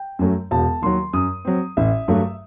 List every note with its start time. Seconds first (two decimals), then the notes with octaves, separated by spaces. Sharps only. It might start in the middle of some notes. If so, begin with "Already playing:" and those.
Already playing: G5
0.19 F#2 F#3 A3
0.51 E1 A5
0.82 D#2 D#3 F#3 C6
1.13 F#2 D#6
1.45 F#3 C4
1.77 A1 E5
2.08 G2 F#3 A3